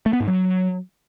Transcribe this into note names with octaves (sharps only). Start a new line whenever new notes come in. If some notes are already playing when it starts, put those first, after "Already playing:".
A3
B3
G#2
F#3